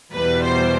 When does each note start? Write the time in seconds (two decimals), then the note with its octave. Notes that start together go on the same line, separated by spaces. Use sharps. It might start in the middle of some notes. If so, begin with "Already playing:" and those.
0.13 E2 B2 G3 B4
0.42 C5